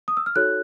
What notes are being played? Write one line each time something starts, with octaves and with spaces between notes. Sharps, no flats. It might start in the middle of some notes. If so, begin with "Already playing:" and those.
D#6
E6
F6
D#4 F#4 A4 C#5 F#6